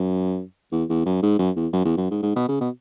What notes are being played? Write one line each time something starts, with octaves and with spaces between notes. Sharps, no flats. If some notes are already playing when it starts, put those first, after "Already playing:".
Already playing: F#2
E2
E2
F#2
G#2
F#2
E2
F#2
E2
F#2
G#2
G#2
B2
C#3
B2